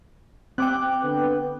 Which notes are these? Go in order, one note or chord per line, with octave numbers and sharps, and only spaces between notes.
C4 G5 D6 F#6
D3 B3 B4